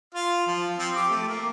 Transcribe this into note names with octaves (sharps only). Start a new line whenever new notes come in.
F4 F5
F3
F3 C4
G4 D6
A3
A#3